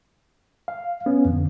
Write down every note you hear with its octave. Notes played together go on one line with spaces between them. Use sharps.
F5
B3 C#4
F2 D3